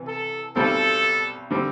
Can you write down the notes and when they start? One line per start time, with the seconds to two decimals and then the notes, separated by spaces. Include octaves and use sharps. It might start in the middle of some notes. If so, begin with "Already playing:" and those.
Already playing: C3 E3 B3
0.08 A4
0.56 B1 B2 G3 C4 A4
1.51 D3 G3 C4